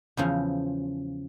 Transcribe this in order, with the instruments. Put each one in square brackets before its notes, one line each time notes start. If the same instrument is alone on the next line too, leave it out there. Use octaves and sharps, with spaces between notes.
[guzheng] E2 C#3 F3